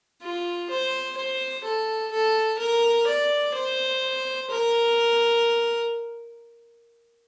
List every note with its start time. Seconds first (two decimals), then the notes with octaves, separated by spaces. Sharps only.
0.22 F4
0.70 C5
1.18 C5
1.64 A4
2.12 A4
2.59 A#4
3.08 D5
3.55 C5
4.51 A#4